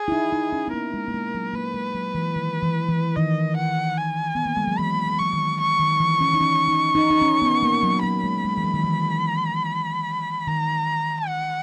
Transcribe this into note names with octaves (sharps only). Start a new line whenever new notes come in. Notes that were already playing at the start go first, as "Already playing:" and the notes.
Already playing: G#4
E4
D#4
D#4
C#4
B3
A#3 A#4
G#3
A#3
G#3
F#3
A#3 B4
G#3
F#3
E3
D#3
E3
E3
D#3 D#5
F#5
G#5
B3
A#3
G#3
F#3
E3 B5
F#3
G#3
F#3 C#6
D#3
C#6
D#3
E3
C#4
D#4
C#4
D#4
D#4
D#4
C#4
B3
A#3
F#3
F#3 B5
G#3
G#3
E3
F#3
D#3
E3
D#3 A#5
F#5